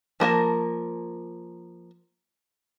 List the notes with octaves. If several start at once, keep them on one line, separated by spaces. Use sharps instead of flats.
F3 A#3 A#4 A5